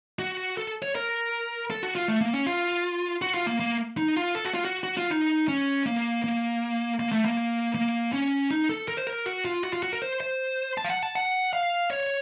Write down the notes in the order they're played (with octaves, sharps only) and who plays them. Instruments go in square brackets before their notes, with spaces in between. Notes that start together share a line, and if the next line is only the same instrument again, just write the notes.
[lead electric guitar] F#4
A4
C#5
A#4
A4
F#4
F4
A3
A#3
C#4
F4
F#4
F4
A#3
A#3
D#4
F4
A4
F#4
F4
F#4
F#4
F4
D#4
C#4
A#3
A#3
A#3
A3
A#3
A#3
C#4
D#4
A4
A#4
C5
A#4
F#4
F4
F#4
F4
F#4
A#4
C5
C5
A5
F5
F#5
A5
F#5
F5
C#5